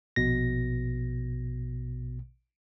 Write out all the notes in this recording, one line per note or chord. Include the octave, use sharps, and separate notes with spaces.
A#1 B2 A#6